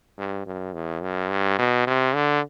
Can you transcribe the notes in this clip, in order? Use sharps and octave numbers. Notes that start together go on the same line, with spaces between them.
G2
F#2
E2
F#2
G2
B2
C3
D3